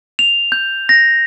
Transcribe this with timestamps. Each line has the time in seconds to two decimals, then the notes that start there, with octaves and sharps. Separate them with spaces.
0.19 F7
0.52 G6
0.89 A#6